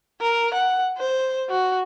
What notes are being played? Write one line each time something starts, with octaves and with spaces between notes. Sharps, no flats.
A#4
F#5
C5
F#4